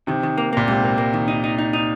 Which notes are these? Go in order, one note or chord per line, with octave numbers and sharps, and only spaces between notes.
C3 D#3
D#3
A#3
A#2 A#3
G#2 C3
A#3
A#3
D#3
D#4
D#4
D#4
D#4